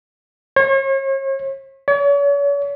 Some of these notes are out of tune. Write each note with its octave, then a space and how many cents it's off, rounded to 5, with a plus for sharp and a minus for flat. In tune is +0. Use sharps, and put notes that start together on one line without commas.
C#5 -40
C#5 +40